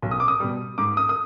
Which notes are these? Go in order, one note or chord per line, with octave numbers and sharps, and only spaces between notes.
B1
D#6
D6
D#6
B2 G3
G#2 D6
D#6
D#6